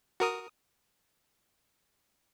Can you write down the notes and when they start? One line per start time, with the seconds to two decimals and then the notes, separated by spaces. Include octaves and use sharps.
0.20 F#4 A#4 D#6